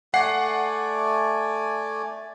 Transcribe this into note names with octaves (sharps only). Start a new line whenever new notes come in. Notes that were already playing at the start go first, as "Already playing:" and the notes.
A3 D5 F#5 G#5 C7